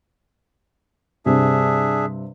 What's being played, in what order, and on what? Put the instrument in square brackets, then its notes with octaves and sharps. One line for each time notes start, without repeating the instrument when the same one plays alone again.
[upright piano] G2 C3 [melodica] D4 G#4 E5